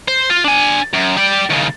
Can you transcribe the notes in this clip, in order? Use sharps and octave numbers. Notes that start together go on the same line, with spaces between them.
C5
F4
D4 G#5
F#2
G4 D5
D#2 C#3